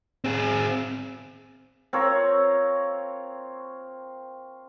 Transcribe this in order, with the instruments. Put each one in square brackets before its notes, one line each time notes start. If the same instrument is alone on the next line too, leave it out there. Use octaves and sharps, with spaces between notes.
[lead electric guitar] C4 G#4
[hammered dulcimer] C4 F4 A#4 C#5